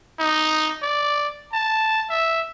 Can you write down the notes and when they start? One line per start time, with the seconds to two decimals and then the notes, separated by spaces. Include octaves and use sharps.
0.20 D#4
0.83 D5
1.53 A5
2.10 E5